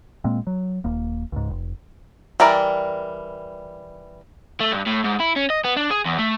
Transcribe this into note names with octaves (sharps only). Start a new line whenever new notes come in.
A#2 G#3 A#3 C4
F#3
D#1 A#3
C#2 G#2
F1
E3 G3 A#4 D5
A3
G2
A2
G#2
E4
C#4
D#5
B3
D4
G#4
E2
A3